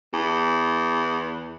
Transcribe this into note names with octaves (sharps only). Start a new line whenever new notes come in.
E2